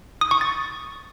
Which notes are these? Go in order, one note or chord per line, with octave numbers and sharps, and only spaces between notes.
D#6
C#6
A6